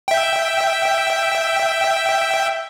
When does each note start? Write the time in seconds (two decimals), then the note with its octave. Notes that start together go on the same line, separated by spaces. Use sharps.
0.08 E5 G5